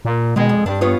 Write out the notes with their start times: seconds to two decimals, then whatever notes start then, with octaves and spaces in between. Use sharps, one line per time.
0.05 A#2
0.36 B2 D#3 G#3
0.49 F2
0.66 G2 D4
0.81 B3 F4 C#5